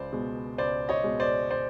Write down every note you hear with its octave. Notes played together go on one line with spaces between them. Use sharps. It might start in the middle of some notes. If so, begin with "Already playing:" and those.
Already playing: C#2 C5 D5
B2 G#3
C#2 C5 D5
C#5 D#5
B2 G#3
C5 D5
C5 D5